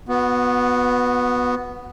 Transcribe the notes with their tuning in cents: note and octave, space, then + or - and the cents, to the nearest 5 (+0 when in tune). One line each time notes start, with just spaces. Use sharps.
B3 +0 F#4 -30